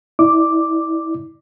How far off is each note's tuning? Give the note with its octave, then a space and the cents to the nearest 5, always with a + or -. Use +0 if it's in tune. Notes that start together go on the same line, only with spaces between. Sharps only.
E4 -25 D5 +15 D6 +0